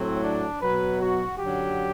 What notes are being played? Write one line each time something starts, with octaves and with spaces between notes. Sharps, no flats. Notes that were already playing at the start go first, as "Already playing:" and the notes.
Already playing: A2 F#3 C4
D4
B2 F#3 B4
F#4
F#2 D3 F#3 G4